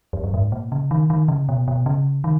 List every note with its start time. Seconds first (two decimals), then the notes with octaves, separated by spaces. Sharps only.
0.13 F2
0.24 F#2
0.34 G#2
0.52 A#2
0.72 C#3
0.91 D#3
1.10 D#3
1.28 C#3
1.49 B2
1.68 B2
1.86 C#3
2.24 D#3